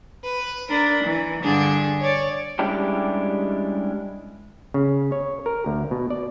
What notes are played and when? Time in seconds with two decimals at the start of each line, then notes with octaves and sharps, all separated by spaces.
0.23 B4
0.70 D4 A#4 B5
1.04 E3
1.42 G2 D3 D4 G#4
2.01 C#5 D5
2.59 G3 G#3 C#4 D4 E4 G4
4.74 C#3
5.12 C#5
5.46 A#4
5.66 D2
5.91 B2
6.10 D5